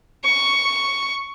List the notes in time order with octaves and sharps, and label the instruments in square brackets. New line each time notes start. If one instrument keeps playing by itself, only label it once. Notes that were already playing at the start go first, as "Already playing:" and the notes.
[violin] C#6